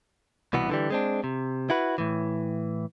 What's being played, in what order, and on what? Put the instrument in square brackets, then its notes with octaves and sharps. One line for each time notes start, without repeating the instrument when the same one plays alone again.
[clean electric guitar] C2 B2 E3 B3
D3 E3 G3
G#3 C4 D4
C3
E4 F#4 B4
A2 E3